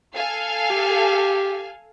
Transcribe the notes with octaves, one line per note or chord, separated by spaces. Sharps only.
A4 F5 G#5
G4